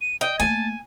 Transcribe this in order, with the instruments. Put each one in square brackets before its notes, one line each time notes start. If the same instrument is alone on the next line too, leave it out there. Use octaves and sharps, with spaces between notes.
[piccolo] D#7
[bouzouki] D#5 [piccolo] G5
[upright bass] A3 A#3 [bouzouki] G#5 [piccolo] A5